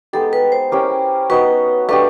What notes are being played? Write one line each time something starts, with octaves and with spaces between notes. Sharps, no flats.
G#3 B3 D#4 G4 A4
B4
C5
C#4 E4 G4 A#4
B3 D#4 F#4 B4
A3 D4 G4 B4